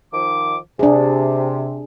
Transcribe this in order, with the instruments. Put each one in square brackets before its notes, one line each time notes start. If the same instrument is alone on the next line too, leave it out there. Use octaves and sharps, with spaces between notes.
[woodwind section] D#3 F3 D6
[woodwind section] C3 [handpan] D4 G#4